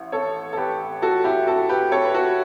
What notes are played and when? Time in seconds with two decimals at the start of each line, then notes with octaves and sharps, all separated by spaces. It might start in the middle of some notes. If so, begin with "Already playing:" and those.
Already playing: A1 A2
0.12 A4 C#5
0.53 A4
0.57 G4 B4
1.02 F#4 A4
1.24 E4 G4
1.47 F#4 A4
1.69 G4 B4
1.92 A4 C#5
2.05 B4
2.14 F#4 A4